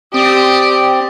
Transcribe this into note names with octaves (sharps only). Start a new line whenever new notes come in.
C4 G4 D5 D#6